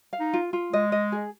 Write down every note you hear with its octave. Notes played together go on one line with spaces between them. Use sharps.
F5
D#4
F4
F4
G#3 D#5
D#5
G#4